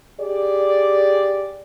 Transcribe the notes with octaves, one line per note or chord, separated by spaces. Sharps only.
G4 G#4 D5